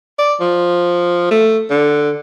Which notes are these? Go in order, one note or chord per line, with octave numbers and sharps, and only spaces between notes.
D5
F3
A3
D3